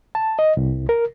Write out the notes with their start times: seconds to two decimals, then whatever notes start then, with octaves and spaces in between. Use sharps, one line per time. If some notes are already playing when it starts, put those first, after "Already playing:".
0.15 A5
0.39 D#5
0.57 C2
0.89 A#4